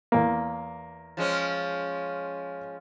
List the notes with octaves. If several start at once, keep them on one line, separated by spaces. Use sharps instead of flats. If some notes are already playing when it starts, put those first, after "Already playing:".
E2 A#3
F3 G#3 C#4